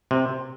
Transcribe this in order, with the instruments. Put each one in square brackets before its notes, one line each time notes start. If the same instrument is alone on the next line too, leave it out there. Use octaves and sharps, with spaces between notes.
[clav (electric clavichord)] C3